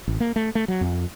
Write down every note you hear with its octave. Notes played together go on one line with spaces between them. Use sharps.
A1
A#3
A3
A3
F#3
F2